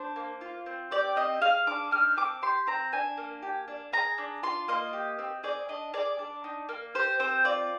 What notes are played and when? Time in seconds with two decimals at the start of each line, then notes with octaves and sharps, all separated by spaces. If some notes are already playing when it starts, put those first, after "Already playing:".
Already playing: D4 C5
0.16 A#3
0.41 F4
0.66 C4
0.91 G4 D5
1.16 C4 D#5
1.41 G#4 F5
1.67 D4 D6
1.91 D#4 F6
2.17 C4 D6
2.42 G4 C6
2.67 C4 A#5
2.92 D4 G#5
3.17 A#3
3.42 G4
3.68 D4
3.93 G#4 A#5
4.18 D4
4.43 F4 C6
4.68 A#3 D#5
4.93 G4
5.19 C4
5.43 G#4 D5
5.69 D4 D#5
5.93 G#4 D5
6.19 D4
6.44 D#4
6.69 A#3
6.95 G4 C5
7.19 C4 C5
7.44 F4 D5